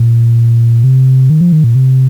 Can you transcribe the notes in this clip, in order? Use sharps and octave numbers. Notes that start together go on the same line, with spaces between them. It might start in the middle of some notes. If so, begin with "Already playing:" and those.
Already playing: A#2
C3
D#3
F3
D#3
A#2
C3